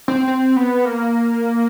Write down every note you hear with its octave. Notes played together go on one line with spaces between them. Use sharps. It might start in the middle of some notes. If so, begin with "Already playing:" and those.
C4
C4
B3
A#3